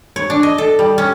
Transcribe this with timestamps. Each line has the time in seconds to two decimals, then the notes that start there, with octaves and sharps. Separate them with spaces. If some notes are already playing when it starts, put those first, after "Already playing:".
0.16 C#5
0.30 D4
0.43 D#5
0.58 A4
0.79 G3
0.98 C#4